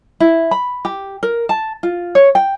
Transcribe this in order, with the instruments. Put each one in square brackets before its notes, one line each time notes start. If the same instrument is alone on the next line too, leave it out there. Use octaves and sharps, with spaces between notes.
[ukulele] E4
B5
G4
A#4
A5
F4
C#5
G5